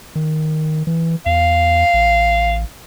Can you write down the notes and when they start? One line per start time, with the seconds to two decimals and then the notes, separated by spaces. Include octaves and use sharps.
0.15 D#3
0.87 E3
1.26 E2 F5
1.94 A1